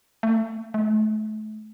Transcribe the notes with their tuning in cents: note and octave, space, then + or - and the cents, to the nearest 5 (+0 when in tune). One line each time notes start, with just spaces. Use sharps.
A3 +30
A3 -35